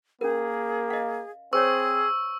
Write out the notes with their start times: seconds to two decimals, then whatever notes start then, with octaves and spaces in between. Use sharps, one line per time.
0.21 A#3 C#4 G#4 A#4
0.90 D#5 F5
1.53 C4 G#4 C5 C#5 C#6 E6